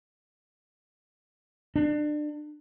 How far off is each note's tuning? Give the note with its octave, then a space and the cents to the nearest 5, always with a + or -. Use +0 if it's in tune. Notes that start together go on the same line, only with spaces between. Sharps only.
D4 +30